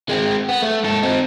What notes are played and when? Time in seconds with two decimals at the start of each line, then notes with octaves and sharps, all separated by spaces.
0.09 G#3 C4
0.49 B3
0.63 A3
0.84 G#2 A4
1.03 C4 D#4